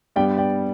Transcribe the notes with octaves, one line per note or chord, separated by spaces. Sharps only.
G2 G3 B3 D5 G5
D5 G5